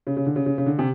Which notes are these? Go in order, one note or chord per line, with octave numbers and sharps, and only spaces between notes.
C#3
C#3
D3
C#3
C#3
C#3
D3
C3